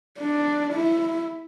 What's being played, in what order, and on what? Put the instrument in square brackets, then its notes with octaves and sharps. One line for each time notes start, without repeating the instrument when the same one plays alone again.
[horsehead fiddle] D4
E4